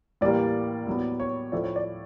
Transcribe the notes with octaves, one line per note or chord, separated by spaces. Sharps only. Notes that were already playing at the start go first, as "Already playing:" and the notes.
A2 E3 G3 A#3 D5
A2 F#3 B3
C#5
A2 F3 A3 D5
C#5
D5